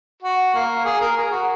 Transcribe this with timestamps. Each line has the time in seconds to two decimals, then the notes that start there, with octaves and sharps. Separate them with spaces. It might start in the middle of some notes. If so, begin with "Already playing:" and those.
0.23 F#4
0.54 A#3
0.85 G#4
1.01 A#4
1.16 G#4
1.31 F#4